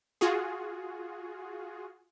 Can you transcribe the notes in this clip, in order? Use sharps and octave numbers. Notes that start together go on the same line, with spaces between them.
F4 F#4 G#4